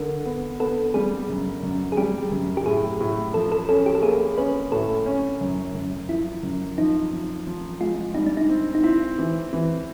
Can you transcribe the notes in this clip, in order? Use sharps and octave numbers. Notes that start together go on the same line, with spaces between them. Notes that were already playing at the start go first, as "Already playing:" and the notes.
Already playing: D3 A#4
B3
B3 A4
G3 G#4
F#2
F#2
G#4
G3 G4
F#2
G4
A2 G#4
A2
F3 A4
A4
C#4 A4
G4
A4
A#3 G#4
C#4 B4
A2 A4
C#4
F#2
F#2
F3 E4
F#2
F3 D#4
F3
F3
G#3 F4
G3 D#4
D4
D#4
C4
D#4
C4 E4
E3
E3